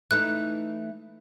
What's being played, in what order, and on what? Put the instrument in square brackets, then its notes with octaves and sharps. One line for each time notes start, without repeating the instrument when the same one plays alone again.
[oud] E3 A3 D#4 [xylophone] F#6